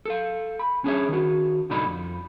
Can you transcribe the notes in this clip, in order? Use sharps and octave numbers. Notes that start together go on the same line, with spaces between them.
A4 F5
B5
C#4 D4 G#4 B4 C#5 E5
D#3 F#4
C2 A2 D3 D#4 D5 B5
F2